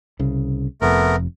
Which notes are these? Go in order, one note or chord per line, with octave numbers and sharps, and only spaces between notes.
C2 C#3
F1 F2 A3 B3 A#4